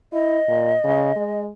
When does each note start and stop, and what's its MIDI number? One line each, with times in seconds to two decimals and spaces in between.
0.13 0.39 64
0.13 1.42 75
0.48 0.74 46
0.84 1.11 49
1.16 1.50 56